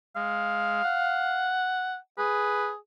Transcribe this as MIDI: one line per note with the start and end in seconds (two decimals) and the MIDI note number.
0.16 0.83 56
0.16 1.56 77
0.84 1.97 78
2.18 2.76 68
2.18 2.70 71